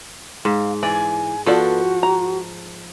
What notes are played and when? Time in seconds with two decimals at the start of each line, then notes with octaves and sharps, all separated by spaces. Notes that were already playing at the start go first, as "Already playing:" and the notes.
0.45 G#2 F5
0.83 E3 D5 G#5
1.46 F3 B3 F#4 A4 D5
2.03 A#5